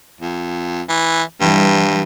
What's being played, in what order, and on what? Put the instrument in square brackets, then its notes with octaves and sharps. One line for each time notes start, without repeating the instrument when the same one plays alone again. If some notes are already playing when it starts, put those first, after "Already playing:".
[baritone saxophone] F2
E3
[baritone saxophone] G2 [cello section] E3 G3